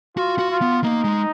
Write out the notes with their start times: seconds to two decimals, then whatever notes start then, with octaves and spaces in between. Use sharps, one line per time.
0.17 F4 F#4
0.39 F#4
0.50 F4
0.62 B3
0.84 A#3 D#4
1.04 G#3